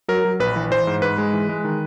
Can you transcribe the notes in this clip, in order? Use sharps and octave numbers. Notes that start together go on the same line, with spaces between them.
F#3 A#4
F#3
A#1 B4
E3
E3 C5
G#2
G#2 B4
G#3
E3
G#3
D#3